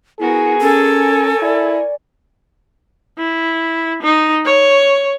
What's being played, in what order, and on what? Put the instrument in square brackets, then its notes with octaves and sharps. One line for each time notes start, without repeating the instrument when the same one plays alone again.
[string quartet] B3 F#4 A#4 [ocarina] E4 [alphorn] G#4
[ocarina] C#4 [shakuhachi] A4 [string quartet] A#4 C#5 G#5
[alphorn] E4 [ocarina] D5
[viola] E4
D#4
C#5